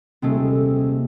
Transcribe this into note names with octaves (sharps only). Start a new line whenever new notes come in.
D#1 C3 G#3 A3